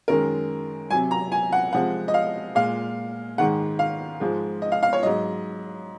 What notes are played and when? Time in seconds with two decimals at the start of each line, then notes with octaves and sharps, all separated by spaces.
0.08 F#2 D#3 G#3 A#4
0.90 C3 F#3 G#5
1.11 A#5
1.32 G#5
1.53 F#5
1.73 C3 F3 G#3 F#5
2.08 D#5
2.14 F5
2.55 A#2 G#3 F5
3.38 G#2 D#3 G#3 F#5
3.79 F5
4.20 G#2 F3 G#3
4.62 D#5
4.72 F5
4.83 F5
4.93 C#5
5.03 G#2 F#3 D#5